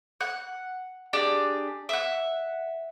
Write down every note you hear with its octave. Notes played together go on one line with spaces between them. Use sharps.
F#5
D4 G4 G#4
E5 F#5